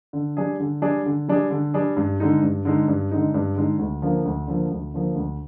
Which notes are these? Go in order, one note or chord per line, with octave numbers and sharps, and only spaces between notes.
D3
G3 D4 G#4
D3
G3 D4 G#4
D3
G3 D4 G#4
D3
G3 D4 G#4
G2
D3 G#3 D#4
G2
D3 G#3 D#4
G2
D3 G#3 D#4
G2
D3 G#3 D#4
D2
D3 F3 A#3
D2
D3 F3 A#3
D2
D3 F3 A#3
D2